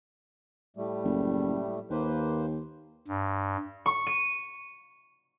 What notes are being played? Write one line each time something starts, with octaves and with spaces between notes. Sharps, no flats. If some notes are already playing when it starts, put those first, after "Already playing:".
A2 G3 A3
F#1
D#2 A#3 B4 C5
G2
C#6
D#7